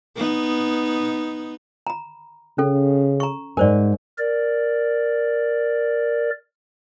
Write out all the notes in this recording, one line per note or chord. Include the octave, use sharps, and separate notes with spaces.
B3 D#4
A#5 B5
C#3 C#4 A4
A#5 C#6
G#2 G#3 A#4 C5 D5 G#5
A#4 D5